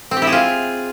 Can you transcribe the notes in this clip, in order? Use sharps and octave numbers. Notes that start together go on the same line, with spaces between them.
C4
G4
E4
G#4
F4